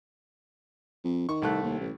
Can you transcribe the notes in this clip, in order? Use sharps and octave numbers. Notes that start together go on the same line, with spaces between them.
F2
D#3 C#6
C2 A3 F#6
D#2
A1